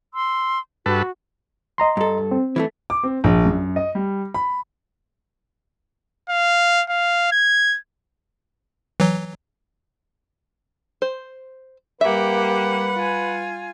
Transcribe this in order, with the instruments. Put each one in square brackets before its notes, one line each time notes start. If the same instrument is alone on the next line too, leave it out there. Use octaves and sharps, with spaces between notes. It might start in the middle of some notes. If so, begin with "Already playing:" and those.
[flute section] C6 E6
[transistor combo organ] G2 A4 B4 [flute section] F#4
[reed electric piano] D#5 A#5 C6
[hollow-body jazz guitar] G2 A4
[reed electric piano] C4
[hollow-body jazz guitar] E3 G3 A3
[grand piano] D6
C4
A#1
F#2
D#5
G3
B5
[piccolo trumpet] F5
F5
G#6
[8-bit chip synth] E3 F#3
[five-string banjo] C5
[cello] G3 F#5 [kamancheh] A#3 G4 [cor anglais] B4 [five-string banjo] E5
[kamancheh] F4 G#5